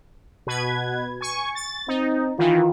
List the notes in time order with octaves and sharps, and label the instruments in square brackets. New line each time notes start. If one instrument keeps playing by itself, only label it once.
[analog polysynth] B2 B4 G#6
G#5 C#6
A6
[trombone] C4 [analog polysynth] D#4
[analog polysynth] D#3 E3 [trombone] F4